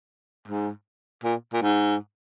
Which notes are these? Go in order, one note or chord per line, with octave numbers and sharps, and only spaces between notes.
G#2
A#2
A#2
G#2